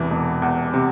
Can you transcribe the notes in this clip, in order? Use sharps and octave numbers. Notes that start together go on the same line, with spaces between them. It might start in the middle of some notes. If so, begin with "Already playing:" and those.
Already playing: E1 E2 C3 E3
E1
E2
C3